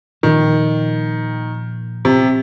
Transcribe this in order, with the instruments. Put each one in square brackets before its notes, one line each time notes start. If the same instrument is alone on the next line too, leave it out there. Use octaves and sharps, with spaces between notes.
[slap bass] A#2 F3 A#3 [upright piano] D#3
[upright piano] C3